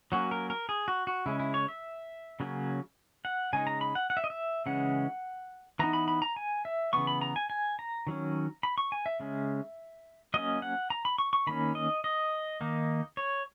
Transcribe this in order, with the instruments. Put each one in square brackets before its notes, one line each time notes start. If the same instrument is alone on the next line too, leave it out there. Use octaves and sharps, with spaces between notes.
[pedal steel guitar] F#3 A#3 C#4 F#4
A#4
A#4
G#4
F#4
F#4
C#3 G#3 C#4 E4
E4
C#5
E5
C#3 F#3 A#3 C#4
F#5
C#3 G#3 D#4 G#5
A#5
B5
F#5
F#5
E5
D#5
E5
C#3 E3 G#3 C#4 F#5
E3 B3 D#4 A#5
B5
B5
A#5
G#5
E5
C#3 E3 B3 C#6
B5
A#5
G#5
G#5
A#5
D#3 F#3 C#4
B5
C#6
G#5
E5
C#3 G#3 C#4
F#3 A#3 C#4 D#5
F#5
A#5
B5
C#6
C#6
D#3 A#3 C#4 B5
D#5
D#5
D#3 A#3 D#4
C#5